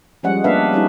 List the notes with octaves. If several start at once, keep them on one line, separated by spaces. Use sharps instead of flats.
F3 G3 G#3 C#4 F#5
A#3 B3 D4 B4 E5 F5
G3 C#4 D#4 F4